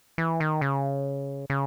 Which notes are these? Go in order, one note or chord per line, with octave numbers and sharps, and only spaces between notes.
E3
D#3
C#3
C#3